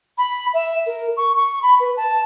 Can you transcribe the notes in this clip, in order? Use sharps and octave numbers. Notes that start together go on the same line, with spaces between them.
B5
E5
A#4
C#6
C#6
B5
B4
A5